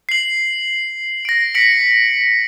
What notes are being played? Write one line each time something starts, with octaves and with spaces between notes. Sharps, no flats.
C7 F#7
A#6 D7
B6 C#7 D7 F#7